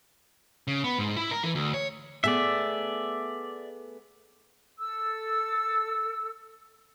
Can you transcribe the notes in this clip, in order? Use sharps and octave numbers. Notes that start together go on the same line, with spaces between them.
C#3
B3
G#2
E4
A#4
E3
D2
C#5
A3 B3 G#4 D5 E5
A4 E6